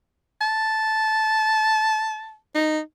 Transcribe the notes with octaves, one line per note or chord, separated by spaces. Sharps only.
A5
D#4